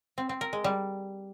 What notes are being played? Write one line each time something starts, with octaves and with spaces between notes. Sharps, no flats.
C4
C4
A#4
G#3
G3